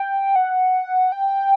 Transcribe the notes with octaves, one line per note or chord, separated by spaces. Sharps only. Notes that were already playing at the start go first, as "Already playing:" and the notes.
Already playing: G5
F#5
G5